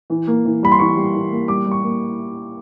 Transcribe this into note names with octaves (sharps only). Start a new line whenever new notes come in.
E3
A#3
E3
G3 B5
C6
E3 C#6
G3
E3
A#3
G3 D6
G3
C#6
A#3